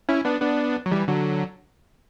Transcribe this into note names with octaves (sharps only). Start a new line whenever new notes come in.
C#4 E4
B3 D4
B3 D4
F#3
E3 G3
D3 F#3